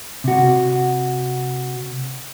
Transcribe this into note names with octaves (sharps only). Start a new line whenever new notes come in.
C3 F#4